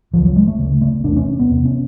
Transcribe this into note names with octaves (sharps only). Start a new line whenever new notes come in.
D2 C#3 F3
F#3
G#3
A3
D2 C#3
A3
E2 C3 D4
C#4
B3
E2 C3
C#4